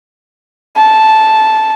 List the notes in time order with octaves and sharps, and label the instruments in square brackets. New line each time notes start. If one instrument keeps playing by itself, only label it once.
[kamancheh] A5